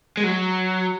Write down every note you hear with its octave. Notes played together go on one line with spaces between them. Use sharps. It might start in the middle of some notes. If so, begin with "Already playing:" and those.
G#3
F#3